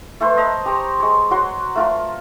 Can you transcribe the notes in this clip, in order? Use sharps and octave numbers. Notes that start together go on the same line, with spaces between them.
A3 A4 B4 C5
D#5 A5 A#5
G4 C5 A#5 C#6
G#3 C#5
F#3 F#4 F#5 C6
A3 F4 A#4